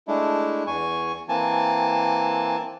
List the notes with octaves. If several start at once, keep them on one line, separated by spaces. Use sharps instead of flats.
G#3 A3 D4 E4
E2 G#5 C#6
E3 A#3 C4 G#5 A5